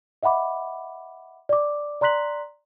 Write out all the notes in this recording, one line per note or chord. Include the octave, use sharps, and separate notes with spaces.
D#5 E5 F#5 B5 D6
D5 D6
D5 A#5 C6 F#6 B6 F#7